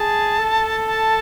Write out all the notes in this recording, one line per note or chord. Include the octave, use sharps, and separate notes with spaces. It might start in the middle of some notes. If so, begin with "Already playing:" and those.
Already playing: G#4 A5
A4
A5